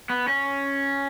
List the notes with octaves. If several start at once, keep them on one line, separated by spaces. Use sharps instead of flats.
B3
C#4